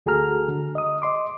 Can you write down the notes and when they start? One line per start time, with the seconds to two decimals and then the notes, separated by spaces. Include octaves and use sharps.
0.06 D2 F#4 G#4 A4 A#5 F6
0.48 D3
0.75 D#5 D#6
1.02 D#5 C6 D6